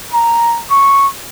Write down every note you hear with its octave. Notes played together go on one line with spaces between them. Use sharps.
A#5
C#6